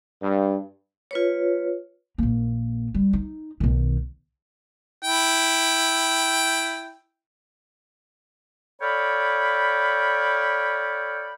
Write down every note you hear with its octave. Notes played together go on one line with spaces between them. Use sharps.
G2
F4 B4 C#5
A#1 A#3
G3
D#4
B1 D#3
E4 G5
A4 C#5 D5 F5 G5 B5